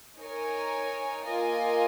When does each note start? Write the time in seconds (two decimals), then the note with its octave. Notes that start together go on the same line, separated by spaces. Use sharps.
0.18 D#4 A#4 C#5 G#5
1.25 A#3 F4 A#4 D#5 G#5